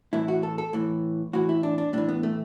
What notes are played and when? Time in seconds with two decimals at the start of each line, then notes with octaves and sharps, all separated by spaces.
0.13 A2 E3 E4
0.28 F#4
0.43 A4
0.58 A4
0.73 A2 E3
1.33 A2 E3 F#4
1.49 E4
1.63 D4
1.78 D4
1.93 A2 E3 D4
2.09 B3
2.23 A3